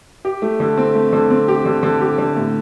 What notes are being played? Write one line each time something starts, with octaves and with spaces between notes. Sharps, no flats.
G4
A3
D3
C4
A3
D3
C4
G4
D3
D3
G4
D3
A2